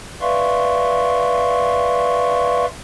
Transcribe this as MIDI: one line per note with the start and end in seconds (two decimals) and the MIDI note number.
0.21 2.66 71
0.21 2.66 74
0.21 2.66 76
0.21 2.66 77
0.21 2.66 84
0.21 2.66 85